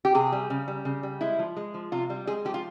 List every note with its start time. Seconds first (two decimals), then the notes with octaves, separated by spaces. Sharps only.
0.05 G4
0.15 C3 G#4
0.32 G3
0.50 C#3
0.68 G3
0.85 C#3
1.03 G3
1.21 G#3 E4
1.39 F3
1.57 G#3
1.74 F3
1.92 C3 F4
2.10 G3
2.27 G#3 G#4
2.45 F3 G4
2.54 F4